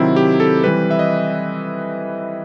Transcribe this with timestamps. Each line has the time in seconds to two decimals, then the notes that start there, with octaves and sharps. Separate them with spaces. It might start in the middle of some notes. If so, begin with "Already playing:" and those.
Already playing: C3 D#3 F#3 C4 E4
0.16 G4
0.40 A4
0.64 E3 G3 C4 B4
0.91 E5
0.99 D#5